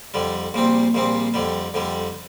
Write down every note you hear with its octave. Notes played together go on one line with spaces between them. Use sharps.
F2 D3 G3
A#1 A#2 G3 C4
A#1 A#2 G3 C4
F2 D3 G3
F2 D3 G3